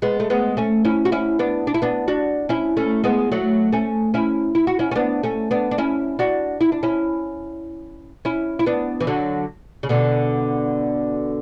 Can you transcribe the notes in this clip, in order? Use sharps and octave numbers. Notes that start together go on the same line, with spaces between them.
G#3 B3
A3
G#3 B3
A3 C#4
C#4 E4
F#4
C#4 E4
B3 D4
D4
E4
B3 D4
D4 F#4
C#4 E4
A3 C#4
G#3 B3
F#3 A3
A3 C#4
C#4 E4
E4
F#4
C#4 E4
C#4
B3 D4
A3 C#4
B3 D4
D4
C#4 E4
D4 F#4
E4
D4
C#4 E4
C#4 E4
E4
B3 D4
E3
D3 F#3
C#3
B2 D3